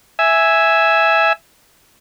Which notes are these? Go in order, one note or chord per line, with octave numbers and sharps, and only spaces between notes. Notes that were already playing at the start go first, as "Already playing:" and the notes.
E5 G#5